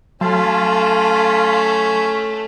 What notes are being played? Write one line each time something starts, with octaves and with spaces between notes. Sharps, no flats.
F#3 A3 C#4 F5 A5 C6